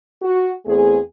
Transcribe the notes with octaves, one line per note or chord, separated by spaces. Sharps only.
F#4
E2 A3 C4 G#4